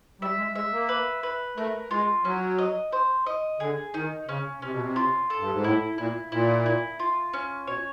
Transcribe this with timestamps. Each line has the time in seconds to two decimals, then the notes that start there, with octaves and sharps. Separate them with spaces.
0.21 G3 E5
0.38 G#3
0.55 G#3 E5
0.72 A#3
0.89 B4
1.23 B4
1.57 A3 A#4
1.91 G#3 F4
2.25 F#3 C#4
2.58 D#5
2.92 C5
3.26 D#5
3.60 D3 G#4
3.94 D#3 D#4
4.28 C#3 C#4
4.62 C3 C#4
4.72 B2
4.80 C3
4.96 F4
5.30 A4
5.39 G2
5.52 G#2
5.63 A2 E4
5.97 A#2 E4
6.32 A#2 E4
6.66 E4
7.00 F4
7.33 C#4
7.67 B2 C#5